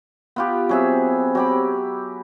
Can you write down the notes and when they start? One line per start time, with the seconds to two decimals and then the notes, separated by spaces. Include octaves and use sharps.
0.36 B3 F4 G4
0.69 F#3 C4 G#4 E5
1.35 F#3 G4 B5